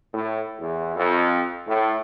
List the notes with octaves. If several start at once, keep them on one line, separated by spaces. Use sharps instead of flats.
A2
E2
F2
A2